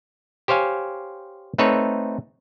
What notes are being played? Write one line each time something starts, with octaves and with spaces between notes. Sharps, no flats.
G4 C5 C#5 F5 G#5
A3 C4 D#4 A4 B4 C#5